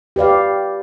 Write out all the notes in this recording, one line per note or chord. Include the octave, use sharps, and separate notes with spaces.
G4 B4 D5 F5